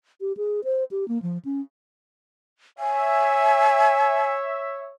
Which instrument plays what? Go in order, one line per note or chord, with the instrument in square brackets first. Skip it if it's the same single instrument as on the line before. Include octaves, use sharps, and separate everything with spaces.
[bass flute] G4
G#4
C5
G4
A#3
F3
C#4
[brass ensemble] C#5 E5 [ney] G#5